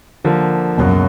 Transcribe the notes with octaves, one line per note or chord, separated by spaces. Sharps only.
D3 F3 A#3
C#2 F#2 B2 F#3 A#3